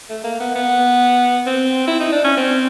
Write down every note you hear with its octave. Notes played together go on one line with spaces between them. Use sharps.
A3
A#3
B3
B3
C4
E4
D#4
D4
C#4
C4